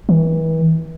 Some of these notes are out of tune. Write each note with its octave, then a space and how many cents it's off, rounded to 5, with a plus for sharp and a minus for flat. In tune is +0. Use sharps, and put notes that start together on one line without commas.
E3 -35